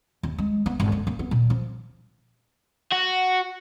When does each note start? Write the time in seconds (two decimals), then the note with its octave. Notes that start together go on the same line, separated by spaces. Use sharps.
0.23 D#2
0.38 G#3
0.66 B3
0.80 G#1
0.92 D3
1.07 A#3
1.19 B3
1.31 A#2
1.50 F3
2.92 F#4